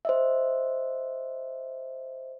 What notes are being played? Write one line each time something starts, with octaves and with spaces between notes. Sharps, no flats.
C5 D#5 E5